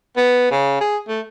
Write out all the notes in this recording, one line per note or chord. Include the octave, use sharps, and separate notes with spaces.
B3
C#3
G#4
A3